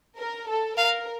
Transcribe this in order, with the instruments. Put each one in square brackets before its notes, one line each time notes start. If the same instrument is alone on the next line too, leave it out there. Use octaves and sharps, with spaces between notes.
[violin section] A#4
A4
[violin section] A#4 [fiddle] F5